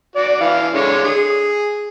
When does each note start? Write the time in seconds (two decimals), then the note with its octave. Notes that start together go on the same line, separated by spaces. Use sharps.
0.16 F#4 D5
0.41 E3 F5
0.74 D3 G#3 C#5
1.04 G#4